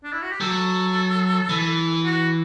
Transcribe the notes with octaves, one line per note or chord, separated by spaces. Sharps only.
D4
E4
F#4
G4
F#3 A4
E3
F#4